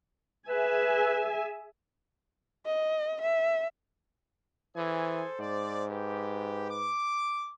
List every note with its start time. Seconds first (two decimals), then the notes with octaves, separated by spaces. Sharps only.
0.49 G#4 B4 E5 G#5
2.66 D#5
3.22 E5
4.77 E3 G#4 A4 C5 G#5
5.39 G#2 D5
5.90 G4 B4
6.70 D6